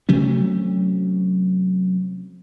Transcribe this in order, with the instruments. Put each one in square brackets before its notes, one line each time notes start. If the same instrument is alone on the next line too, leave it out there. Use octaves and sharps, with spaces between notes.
[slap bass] C3 F#3 A3 C#4